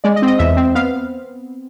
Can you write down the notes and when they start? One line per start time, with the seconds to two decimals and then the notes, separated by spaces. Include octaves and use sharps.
0.04 G#3 D5
0.16 D#5
0.22 C4
0.27 D#5
0.39 E2 E5
0.57 C4
0.75 B3 F5